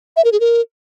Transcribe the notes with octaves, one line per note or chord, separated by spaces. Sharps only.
E5
A#4
G#4
A#4